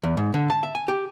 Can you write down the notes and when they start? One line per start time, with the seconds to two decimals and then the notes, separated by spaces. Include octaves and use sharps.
0.03 E2
0.17 G#2
0.34 D3
0.50 A5
0.63 E5
0.75 G#5
0.88 G4